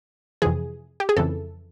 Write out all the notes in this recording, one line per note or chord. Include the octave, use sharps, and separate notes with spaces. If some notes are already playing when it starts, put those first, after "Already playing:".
F2 C3 E3 G#4
G4
G#4
F2 C#3 E3 A4